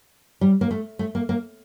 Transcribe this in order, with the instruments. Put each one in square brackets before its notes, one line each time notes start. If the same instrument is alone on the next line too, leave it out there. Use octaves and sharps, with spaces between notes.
[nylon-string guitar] G3
A#3
A3
A3
A#3
A#3